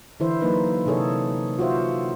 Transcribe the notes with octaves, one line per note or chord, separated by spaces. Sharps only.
D3 E3 E4 C5 E5
F#3 A#3 D#4 B4
C3 D#4 G#4 A4 C#5
F4 F#4 C5 E5